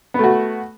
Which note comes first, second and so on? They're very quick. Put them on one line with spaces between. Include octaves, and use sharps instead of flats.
B3 A3 F#4